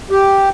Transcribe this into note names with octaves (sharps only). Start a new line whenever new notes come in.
G4